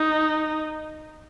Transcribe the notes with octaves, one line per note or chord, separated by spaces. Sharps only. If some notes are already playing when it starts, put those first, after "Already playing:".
Already playing: D#4